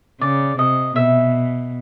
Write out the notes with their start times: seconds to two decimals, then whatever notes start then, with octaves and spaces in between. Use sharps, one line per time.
0.21 C#3 D5
0.58 C3 D#5
0.96 B2 E5